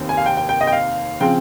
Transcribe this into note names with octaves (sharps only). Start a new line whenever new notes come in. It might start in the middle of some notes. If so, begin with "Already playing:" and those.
Already playing: F1 D#2 D#3 A#3
G#5
F5
G5
G5
G5
D#5
G5
F5
C#3 F3 C4 G5